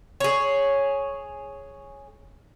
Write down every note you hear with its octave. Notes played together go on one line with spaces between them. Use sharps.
G#4 C#5